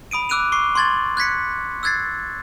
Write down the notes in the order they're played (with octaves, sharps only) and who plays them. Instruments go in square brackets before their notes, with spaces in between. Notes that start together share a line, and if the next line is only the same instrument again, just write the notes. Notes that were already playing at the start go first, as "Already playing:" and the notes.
[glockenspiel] B5 D#6 D7 D#7
D6 E6 F#6 D7 D#7 F7
C#6 D6 C7
C6 C#6 G#6 A6 F#7
F#6 G#6 B6 C#7
E6 F#6 G#6 A6 C7